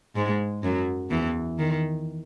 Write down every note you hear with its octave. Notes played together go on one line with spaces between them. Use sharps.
G#2 G#3
F#2 F#3
E2 E3
D#3